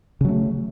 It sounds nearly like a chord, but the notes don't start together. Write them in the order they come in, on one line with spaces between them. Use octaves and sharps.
C#3 F#3 A3